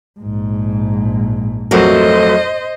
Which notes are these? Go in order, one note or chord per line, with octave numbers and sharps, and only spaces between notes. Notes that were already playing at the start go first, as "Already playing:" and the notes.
A#1 G#2
F2 F#3 A3 F#4 A#4 C5 D#5